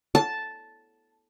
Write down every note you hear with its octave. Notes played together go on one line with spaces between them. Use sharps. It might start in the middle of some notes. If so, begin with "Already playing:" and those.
A5